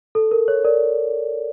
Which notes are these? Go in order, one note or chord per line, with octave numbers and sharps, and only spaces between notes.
A4
A#4
C#5
A#4 D5